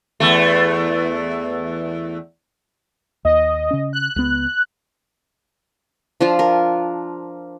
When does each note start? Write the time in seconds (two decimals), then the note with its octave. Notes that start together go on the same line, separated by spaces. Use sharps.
0.20 E2 A3
3.25 D#2 D#5
3.71 C#3 C#4
3.93 F#6
4.16 C#2 B3
6.21 F3 D4 F4
6.39 A#4